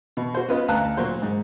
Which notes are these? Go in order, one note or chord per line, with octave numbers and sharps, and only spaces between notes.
B2
F#4 C5
B3 C#4 F4 B4 D#5
D2 F5 A5 A#5 F#6
A#2 F#3 C5
G#2